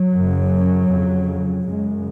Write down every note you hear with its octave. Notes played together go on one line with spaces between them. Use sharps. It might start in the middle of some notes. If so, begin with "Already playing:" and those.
Already playing: F#3
F#2 C#3
F2 C#3
F#2 C#3 G#3